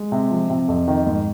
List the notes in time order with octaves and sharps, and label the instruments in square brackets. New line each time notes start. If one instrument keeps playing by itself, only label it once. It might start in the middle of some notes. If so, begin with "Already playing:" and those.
Already playing: [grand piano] G#3
C3
F3
C3
F2
D#3
G#2